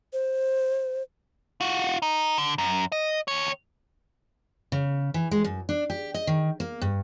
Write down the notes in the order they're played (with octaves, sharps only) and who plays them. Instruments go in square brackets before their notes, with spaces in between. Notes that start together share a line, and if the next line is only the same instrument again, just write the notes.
[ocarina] C5
[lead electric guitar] F4 F#4
D#4
D3
F#2
D#5
D#2 C#5
[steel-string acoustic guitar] C#3
E3
G#3
F#2
D4
G4
D#5
D#3
A#3
G2